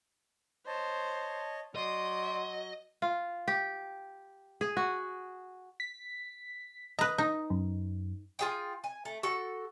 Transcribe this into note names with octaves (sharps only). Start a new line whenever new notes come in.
C5 C#5 D#5 A5
F#3 D5 D#5 C6 G6
F4
G4
G#4
F#4
B6
B4 D#5 A#5
D#4 D#5
F#2
F4 G#4 G5
G#5
A3
F#4 A4